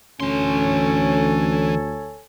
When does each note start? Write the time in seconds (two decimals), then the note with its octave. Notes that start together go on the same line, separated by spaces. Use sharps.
0.20 D2 E3 C#4 A4 C#5 G#5 C6